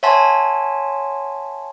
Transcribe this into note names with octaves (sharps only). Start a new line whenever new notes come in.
C#5 E5 F#5 G#5 A5 C6